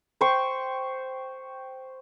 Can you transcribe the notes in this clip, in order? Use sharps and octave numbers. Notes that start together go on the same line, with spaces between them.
C5 G5 C6 C#6